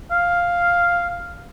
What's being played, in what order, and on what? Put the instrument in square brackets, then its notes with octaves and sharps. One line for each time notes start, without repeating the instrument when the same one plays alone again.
[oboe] F5